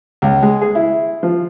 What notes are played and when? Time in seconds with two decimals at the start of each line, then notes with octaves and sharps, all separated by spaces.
0.22 C#2
0.42 G#3
0.61 G#4
0.75 E4
1.23 F3